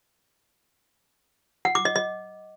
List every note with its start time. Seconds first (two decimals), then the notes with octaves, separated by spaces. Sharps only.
1.65 F#5
1.75 D6
1.85 D#5
1.96 D#5